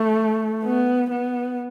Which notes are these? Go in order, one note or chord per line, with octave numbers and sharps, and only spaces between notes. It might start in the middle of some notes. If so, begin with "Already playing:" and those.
Already playing: A3
B3
B3